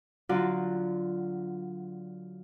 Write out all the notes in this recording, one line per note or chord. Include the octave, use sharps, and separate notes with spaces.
D3 F#3 F4 F#4 D5